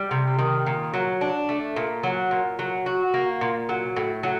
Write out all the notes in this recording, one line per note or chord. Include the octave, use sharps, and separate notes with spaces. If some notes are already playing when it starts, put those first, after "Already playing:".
Already playing: G3
C3
D#3
A#2
F#3
D4
A3
A#2
F#3
A#2
F#3
F#4
A#3
A#2
F#3
A2
F#3